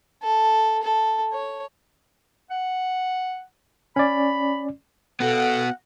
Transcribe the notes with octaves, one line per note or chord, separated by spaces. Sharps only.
A4
A4
C#5
F#5
C#4 D5 B5
B3 F#4 A4 F#5